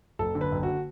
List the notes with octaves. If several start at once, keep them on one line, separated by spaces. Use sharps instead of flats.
F#1 A4
D3
B4
F#1
F#4